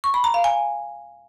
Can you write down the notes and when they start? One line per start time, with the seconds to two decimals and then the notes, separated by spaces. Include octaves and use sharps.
0.04 C#6
0.14 B5
0.24 A#5
0.34 F5
0.44 G#5